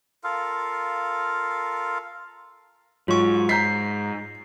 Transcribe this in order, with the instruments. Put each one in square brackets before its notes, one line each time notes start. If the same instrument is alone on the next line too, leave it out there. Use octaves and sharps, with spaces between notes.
[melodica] F4 A4 A#4 F5
[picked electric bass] G#2 [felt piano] F#3 [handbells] F4 C#6
[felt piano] A#5 G6 B6 [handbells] C7